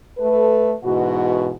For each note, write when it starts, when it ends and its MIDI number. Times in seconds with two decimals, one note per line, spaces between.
0.18 0.73 57
0.18 0.73 69
0.18 0.73 71
0.83 1.52 44
0.83 1.52 47
0.83 1.52 52
0.83 1.52 66